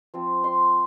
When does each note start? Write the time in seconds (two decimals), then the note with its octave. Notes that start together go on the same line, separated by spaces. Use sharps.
0.14 F3 C4 F4
0.44 C6